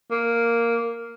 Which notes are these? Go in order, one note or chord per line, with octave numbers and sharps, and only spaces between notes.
A#3